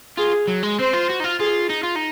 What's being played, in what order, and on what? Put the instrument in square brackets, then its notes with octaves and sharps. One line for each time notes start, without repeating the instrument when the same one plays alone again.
[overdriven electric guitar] F4 [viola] G#4
[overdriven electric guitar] F#3
G#3
[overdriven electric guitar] C4 [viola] C5
[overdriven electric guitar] F4
F#4
D#4
F4
[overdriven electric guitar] F4 [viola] G#4
[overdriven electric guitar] D#4
F4
D#4